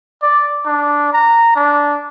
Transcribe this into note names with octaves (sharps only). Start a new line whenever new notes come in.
D5
D4
A#5
D4